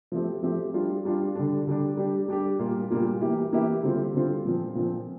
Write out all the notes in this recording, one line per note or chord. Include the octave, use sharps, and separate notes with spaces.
F3 A3 C4 G4
F3 A3 C4 G4
G3 D4 F4
G3 D4 F4
D3 G3 D4
D3 G3 D4
G3 D4 G4
G3 D4 G4
A#2 G3 A#3 F4
A#2 G3 A#3 F4
E3 A#3 E4 G4
E3 A#3 E4 G4
D3 G3 C4 F4
D3 G3 C4 F4
A#2 F3 C4
A#2 F3 C4